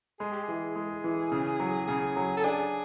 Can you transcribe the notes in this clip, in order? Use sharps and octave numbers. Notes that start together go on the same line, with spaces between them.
G#3 G#4
G4
E3 G#4
G#3
E3
C#3
F#3
C#3 G#4
F#3
A4
D4 G#4